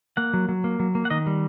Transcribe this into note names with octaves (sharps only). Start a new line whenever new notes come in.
A#3 F#5
F#3
F#3
A#3
F#3
A#3
F#5
D#3 D#5
G3